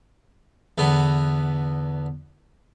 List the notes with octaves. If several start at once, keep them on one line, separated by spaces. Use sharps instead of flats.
E2 D3 B3